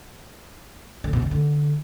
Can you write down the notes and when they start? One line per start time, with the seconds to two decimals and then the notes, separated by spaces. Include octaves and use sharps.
1.04 D3
1.13 B2
1.22 C#3
1.31 D3